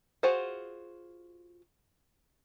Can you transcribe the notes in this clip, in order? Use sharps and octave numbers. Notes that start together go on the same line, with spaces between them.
F4 F#4 G#4 C5 F#5